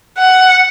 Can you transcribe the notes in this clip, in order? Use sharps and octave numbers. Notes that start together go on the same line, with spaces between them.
F#5